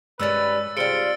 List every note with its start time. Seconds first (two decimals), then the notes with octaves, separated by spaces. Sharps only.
0.20 G2 D#3 G3 G#3 C#4 B4 E6 A6
0.77 C3 G3 F4 G#4 C5 C#7 D7 G7